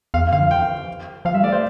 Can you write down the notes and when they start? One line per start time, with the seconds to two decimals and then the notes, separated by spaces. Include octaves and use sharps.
0.14 E2 F5
0.23 F2
0.32 D3 F5
0.42 F3
0.51 G5
1.25 F3 F5
1.34 G3 E5
1.44 A3 D5
1.52 C5